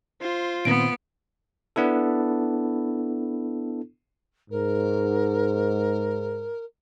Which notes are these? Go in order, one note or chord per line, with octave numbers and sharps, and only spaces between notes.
F4 C5
A#2 D#3 B3 C4 D7
B3 D4 E4 A4
G#2 A#4